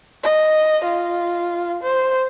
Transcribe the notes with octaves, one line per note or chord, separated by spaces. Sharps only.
D#5
F4
C5